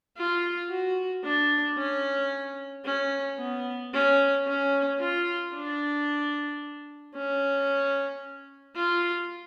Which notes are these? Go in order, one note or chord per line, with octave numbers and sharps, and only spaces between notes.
F4
F#4
D4
C#4
C#4
B3
C#4
C#4
F4
D4
C#4
F4